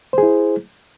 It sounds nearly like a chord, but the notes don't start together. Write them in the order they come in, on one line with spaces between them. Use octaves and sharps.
C5 G#4 E4